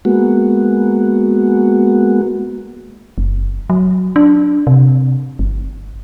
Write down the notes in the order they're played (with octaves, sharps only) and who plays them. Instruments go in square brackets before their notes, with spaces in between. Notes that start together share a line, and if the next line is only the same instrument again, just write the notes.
[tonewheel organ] G#3 A#3 B3 F#4
[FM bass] F#1
F#3
D4
C3
G1